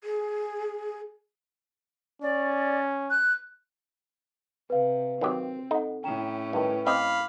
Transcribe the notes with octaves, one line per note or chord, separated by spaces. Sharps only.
G#4
C#4 D5
F#6
C3 B4 F5
D#3 F#3 C4 G4
D#4 A4 F#5
A2 C#4 G5 A#5 E7
G2 D#3 B4 G5
C4 D#5 F5 B5 D6